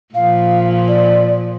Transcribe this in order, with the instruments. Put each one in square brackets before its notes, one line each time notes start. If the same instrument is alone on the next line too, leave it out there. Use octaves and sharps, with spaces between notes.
[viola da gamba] A#2 F3 [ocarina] F5
[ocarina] D5